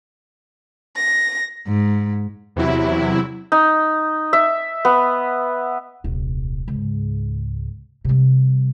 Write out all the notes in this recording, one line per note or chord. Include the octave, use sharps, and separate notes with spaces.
A#6
G#2
E2 C3 F#3 E4
D#4
E5
B3
D#1 C2
C#2 G#2
C3 G3